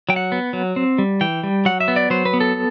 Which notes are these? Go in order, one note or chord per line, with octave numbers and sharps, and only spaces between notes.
F#3 G5
F#5
B3
F#3
C4
G3
E3 G5
G3
F#3 F#5
E5
B3
D5
F#3 C5
B4
B3
A4